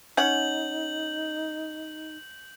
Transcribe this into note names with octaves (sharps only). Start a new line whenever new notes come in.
C#4 D#4 F#5 G6 F#7